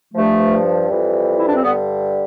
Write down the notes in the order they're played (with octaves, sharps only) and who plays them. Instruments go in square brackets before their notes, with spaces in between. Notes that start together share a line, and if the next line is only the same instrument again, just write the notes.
[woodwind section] G2 F3 A3
F2 E3 G3
E4
D4
C4
G2 D3 G3 B3